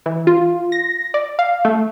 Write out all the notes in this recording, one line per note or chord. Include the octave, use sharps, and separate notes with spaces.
E3
F4
A#6
D5
F5
A3